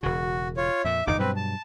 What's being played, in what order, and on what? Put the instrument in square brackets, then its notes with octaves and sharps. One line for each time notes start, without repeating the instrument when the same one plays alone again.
[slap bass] E1 C#3 [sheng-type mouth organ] F#4
[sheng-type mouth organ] F4 C#5
[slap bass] F2 A#2 [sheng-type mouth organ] E5
[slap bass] G1 E2 G2 [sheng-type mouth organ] D#4 D6
[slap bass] G2 B2 F#3 [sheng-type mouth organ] C4 B4
[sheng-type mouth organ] A5